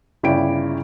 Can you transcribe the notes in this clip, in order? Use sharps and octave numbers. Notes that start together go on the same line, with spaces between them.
G1 C#3 E4 D5 G5 D7